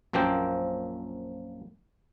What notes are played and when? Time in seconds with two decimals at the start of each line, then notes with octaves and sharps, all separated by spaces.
0.13 A#1 F#2 F3 A#3 C4 G5